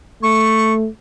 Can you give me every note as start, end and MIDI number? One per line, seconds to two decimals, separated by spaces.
0.23 0.87 57
0.23 0.73 85